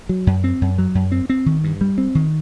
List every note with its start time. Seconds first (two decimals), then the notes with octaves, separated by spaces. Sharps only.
0.09 F#3
0.27 F#2
0.44 C4
0.61 F#2
0.78 F#3
0.95 F#2
1.12 C4
1.30 C4
1.46 D#3
1.64 G2
1.81 G3
1.98 C4
2.15 D#3